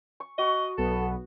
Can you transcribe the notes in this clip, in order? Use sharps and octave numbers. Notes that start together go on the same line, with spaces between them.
C#6
F#4 D#5 C#6
B1 B3 A4